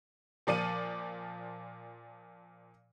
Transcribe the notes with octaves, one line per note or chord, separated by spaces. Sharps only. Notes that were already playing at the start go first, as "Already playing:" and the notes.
A#2 F3 D5 C#7 D#7